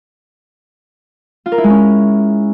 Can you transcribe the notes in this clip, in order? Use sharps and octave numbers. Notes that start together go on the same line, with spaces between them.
F4
A#4
E4
G#3
C#4